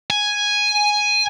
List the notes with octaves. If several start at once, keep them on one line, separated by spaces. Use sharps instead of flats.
G#5